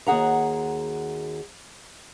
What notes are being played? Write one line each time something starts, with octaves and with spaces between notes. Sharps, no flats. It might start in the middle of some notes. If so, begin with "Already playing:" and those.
D#2 F#4 G#4 F#5 A#5